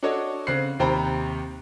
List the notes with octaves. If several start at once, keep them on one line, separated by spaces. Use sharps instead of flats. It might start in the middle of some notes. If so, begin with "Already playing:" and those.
D4 F#4 A4 C#5 D#5
C#3 C4 F#6 C7
D#2 C3 C5 G5 A#5 B5